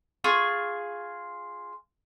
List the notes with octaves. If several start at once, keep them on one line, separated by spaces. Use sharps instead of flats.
F4 G#4 C#6